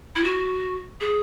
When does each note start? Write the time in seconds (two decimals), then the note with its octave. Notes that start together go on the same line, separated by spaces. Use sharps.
0.15 E4
0.23 F#4
1.00 G#4